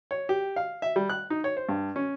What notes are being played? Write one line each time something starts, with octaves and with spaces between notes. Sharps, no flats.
C#5
G4
F5
E5
G3
F#6
D#4
C#5
C5
G2
C#4